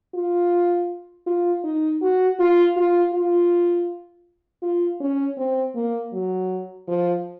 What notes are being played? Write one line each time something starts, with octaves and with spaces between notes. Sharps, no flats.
F4
F4
D#4
F#4
F4
F4
F4
F4
C#4
C4
A#3
F#3
F3